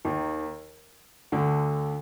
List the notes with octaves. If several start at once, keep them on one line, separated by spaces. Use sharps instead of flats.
D#2 D#3
D2 D3